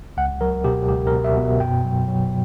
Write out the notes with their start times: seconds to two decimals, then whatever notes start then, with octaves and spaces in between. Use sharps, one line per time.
0.17 C#2 F#5
0.41 F#3 A#4
0.64 B2 G4
0.89 C#2 G4
1.07 A#4
1.13 B2
1.24 E5
1.37 B2
1.60 F#2 G5
1.85 F#3
2.08 F#3